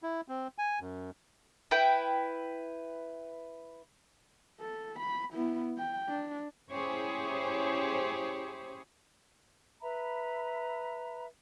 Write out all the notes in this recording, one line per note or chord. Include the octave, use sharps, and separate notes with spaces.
E4
C4
G#5
F#2
E4 B4 G5
A4
B5
B3 E4
G5
D4
C#4 E4 G4 G#4 C5 C#5
B4 E5 A#5 B5